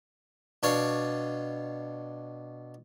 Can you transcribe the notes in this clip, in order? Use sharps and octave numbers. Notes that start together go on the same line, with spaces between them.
B2 D4 C#5 F5